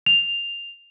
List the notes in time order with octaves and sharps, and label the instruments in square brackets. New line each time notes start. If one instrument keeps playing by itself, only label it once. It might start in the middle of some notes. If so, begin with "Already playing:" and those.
[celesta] F7